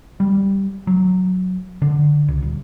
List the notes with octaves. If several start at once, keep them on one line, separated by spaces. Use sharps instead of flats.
G3
F#3
D3
C#2
D#1